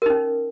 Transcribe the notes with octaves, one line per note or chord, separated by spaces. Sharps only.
C#4 D#4 A#4